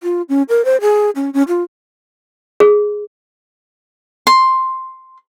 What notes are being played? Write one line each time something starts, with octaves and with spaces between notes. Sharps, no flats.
F4
C#4
A#4
C5
G#4
C#4
C#4
F4
G#4
C6